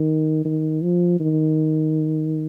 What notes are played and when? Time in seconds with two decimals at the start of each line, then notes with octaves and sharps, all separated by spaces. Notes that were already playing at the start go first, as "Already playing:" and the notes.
Already playing: D#3
0.45 D#3
0.82 F3
1.20 D#3